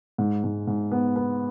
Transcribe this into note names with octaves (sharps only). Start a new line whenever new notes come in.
G#2
G#2
G#2
B3
B3